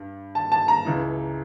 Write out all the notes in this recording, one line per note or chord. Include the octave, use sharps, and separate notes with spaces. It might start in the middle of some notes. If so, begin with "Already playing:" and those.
Already playing: G2
A5
A5
A#5
C#2 C#3 E3